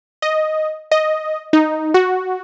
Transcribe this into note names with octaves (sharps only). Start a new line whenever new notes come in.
D#5
D#5
D#4
F#4